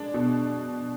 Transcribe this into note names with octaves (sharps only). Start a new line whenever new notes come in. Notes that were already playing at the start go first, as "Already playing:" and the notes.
Already playing: G#3 D4
B2